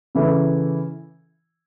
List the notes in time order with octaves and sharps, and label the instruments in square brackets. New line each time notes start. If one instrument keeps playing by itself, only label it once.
[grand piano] C#3 E3 A3 E4